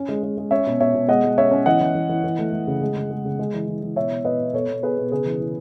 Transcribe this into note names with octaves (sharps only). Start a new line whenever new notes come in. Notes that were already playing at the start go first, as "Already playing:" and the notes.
Already playing: C#4
G#3
G#3
G#3
C#4 C#5 E5
B2
B2 C#5 E5
B2
G#3 D#5 F#5
G#3
C#4 C#5 E5
C#4
E3 D#5 F#5
E3
E3
E3
E3
A3
A3
C#3
G#3
C#3
G#3
C#3
G#3
E3
E3
E3
B2 C#5 E5
B2
B2 B4 D#5
B2
B2 A4 C#5
B2
B3 G#4 B4
B2
C#3 G#4 B4
E3
E3